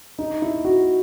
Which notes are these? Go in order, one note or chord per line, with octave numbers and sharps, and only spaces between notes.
D#4
E4
F#4